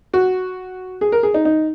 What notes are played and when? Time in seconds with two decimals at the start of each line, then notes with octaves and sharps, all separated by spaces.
0.14 F#4
1.01 G#4
1.12 A#4
1.23 G#4
1.34 D#4
1.45 D#4